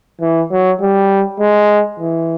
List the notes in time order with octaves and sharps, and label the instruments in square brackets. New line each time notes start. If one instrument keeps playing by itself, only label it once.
[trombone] E3
F#3
G3
G#3
E3